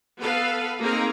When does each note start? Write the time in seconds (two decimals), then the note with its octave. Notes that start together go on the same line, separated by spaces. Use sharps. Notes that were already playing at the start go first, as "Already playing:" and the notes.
0.20 B3 A4 B4 F5
0.80 A#3 C4 D#4 G#4 A#4